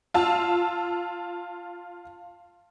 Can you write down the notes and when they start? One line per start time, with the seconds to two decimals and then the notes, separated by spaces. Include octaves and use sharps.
0.14 F4 A5 E6